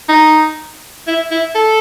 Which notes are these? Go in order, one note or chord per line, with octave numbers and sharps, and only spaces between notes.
D#4
E4
E4
A4